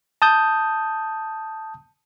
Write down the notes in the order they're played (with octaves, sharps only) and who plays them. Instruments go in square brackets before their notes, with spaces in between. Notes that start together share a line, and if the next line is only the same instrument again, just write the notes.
[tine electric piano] A5 D#6 G6